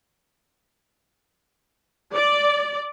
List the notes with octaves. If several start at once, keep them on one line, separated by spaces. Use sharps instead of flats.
D5